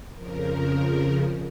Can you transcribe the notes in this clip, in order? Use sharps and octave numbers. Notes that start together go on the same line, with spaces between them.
F2 C#3 F3 A#4